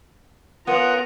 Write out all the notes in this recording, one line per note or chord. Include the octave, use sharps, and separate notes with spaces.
B3 C#4 F4 A#4 F#5 D#6